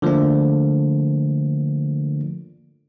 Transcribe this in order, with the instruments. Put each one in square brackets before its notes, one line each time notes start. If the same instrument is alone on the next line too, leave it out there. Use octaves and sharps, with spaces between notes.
[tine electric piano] D3 F3 A3 A#3 D4